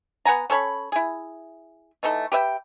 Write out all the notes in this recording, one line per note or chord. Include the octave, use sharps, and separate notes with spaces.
B3 F#5 G#5 A#5
C#4 A4 C#5 B5
E4 G#4
E3 A3 D#4 A4
G4 B4 E5 G5